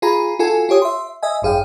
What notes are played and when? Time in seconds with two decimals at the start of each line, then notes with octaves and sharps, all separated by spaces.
0.02 F4 G#4 G#5 A#5 B5
0.39 F4 F#4 A4 G#5
0.69 F4 G4 C#5 D#6
0.82 E5 C6
1.23 D#5 E5 G#5
1.42 G#1 F#2 G#4 F5 G5